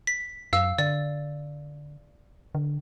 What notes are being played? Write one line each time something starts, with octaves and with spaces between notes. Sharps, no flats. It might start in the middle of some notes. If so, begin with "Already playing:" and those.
B6
F#2 F5 E6
D3 D5
D3